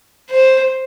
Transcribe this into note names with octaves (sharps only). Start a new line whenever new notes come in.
C5